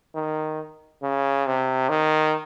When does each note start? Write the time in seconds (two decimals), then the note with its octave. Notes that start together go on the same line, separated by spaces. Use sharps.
0.15 D#3
1.02 C#3
1.46 C3
1.89 D#3